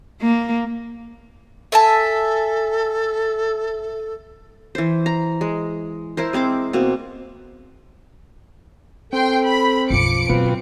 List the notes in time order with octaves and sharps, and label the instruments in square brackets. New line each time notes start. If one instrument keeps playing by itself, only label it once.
[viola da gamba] A#3
[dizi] A4 [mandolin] E5 G#5 A5
[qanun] E3 C5
A#5
G#3
E4 A#4 C5
G#3 C4 C5 D6
B2 A#3 C4
[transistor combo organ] C4 [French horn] A4 [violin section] G5 C6
[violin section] B5
[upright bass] B1 F#2 [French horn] F3 [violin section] D6 C#7 D7
[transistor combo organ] B2 F4 B4 [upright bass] D#3 F#3 [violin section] C4